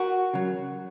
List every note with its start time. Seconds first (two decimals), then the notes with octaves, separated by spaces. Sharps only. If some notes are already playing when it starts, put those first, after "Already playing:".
Already playing: F#4 A#4
0.34 C#3 F#3